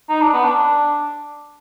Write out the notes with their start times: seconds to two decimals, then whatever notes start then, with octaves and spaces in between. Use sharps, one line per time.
0.09 D#4
0.21 D4
0.33 B3
0.45 D4